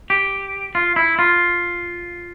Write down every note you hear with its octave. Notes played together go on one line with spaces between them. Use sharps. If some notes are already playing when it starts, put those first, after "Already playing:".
G4
F4
E4
F4